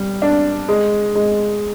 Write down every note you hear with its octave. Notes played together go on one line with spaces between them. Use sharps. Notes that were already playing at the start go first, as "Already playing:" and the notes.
Already playing: G3
D4
G#3
G#3